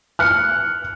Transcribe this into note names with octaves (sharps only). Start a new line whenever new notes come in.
F6 F#6 C#7